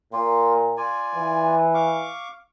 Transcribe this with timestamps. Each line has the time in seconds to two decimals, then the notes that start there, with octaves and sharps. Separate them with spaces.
0.13 A#2 A#3 F4
0.77 F4 D5 G#5
1.15 E3
1.74 F5 C#6 D6